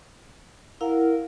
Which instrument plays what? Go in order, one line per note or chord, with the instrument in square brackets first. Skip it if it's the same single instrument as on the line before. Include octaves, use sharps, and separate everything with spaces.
[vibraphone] E4 F5 F#5 [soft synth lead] A#4